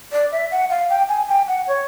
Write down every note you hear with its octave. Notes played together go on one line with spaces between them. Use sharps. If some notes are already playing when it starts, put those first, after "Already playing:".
D5
E5
F#5
F5
G5
G#5
G5
F#5
C#5